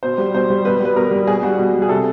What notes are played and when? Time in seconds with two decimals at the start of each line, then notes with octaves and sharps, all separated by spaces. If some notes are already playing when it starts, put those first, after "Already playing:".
0.03 B2 C5
0.18 G3
0.34 B2 C5
0.50 G3
0.65 B2 B4
0.80 G3 B4
0.96 B2 A#4
1.11 G3
1.27 B2 G#4
1.43 G3 F#4
1.58 B2
1.74 G3
1.82 G#4
1.89 C3 A4